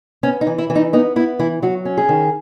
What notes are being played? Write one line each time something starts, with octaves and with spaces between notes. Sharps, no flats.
B3 C#4
D#4
E3
E4
E3
D#4
B3 D#4
B3 E4
E3 E4
F#3 F#4
C#4
G#4
D#3